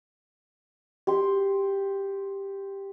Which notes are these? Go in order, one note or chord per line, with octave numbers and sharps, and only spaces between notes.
G4 C6